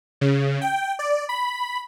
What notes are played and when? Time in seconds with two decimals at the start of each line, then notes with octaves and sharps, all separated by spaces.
0.21 C#3
0.61 G5
0.99 D5
1.29 B5